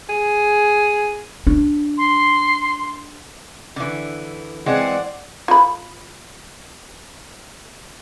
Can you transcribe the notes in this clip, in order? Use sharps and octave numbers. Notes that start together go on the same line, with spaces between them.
G#4
D4
C6
D3 E3
E3 G#3 C4 D5 F#5
F4 B5